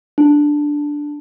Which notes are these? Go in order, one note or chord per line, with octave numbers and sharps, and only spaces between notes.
D4